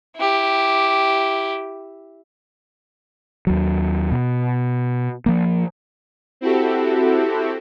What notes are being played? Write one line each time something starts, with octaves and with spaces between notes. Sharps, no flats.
E4 G4
D#2 F#3
B2
F3 A#3
C4 E4 F#4 G4 A4